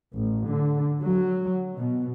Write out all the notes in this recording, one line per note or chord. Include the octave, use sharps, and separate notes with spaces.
A1
D3
F#3
B2